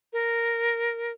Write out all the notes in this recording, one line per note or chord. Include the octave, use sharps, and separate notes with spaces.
A#4